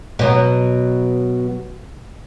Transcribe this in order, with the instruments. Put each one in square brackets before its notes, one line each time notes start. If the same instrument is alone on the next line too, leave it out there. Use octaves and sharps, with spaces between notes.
[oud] B2 F#3